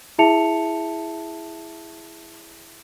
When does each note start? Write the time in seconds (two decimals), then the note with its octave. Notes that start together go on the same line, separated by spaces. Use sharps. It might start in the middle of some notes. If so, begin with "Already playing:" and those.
0.18 E4 G#4 E5 A5 C#7 F7